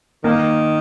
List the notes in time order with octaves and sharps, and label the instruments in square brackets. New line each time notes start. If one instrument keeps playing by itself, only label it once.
[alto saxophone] D#3 [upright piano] A#3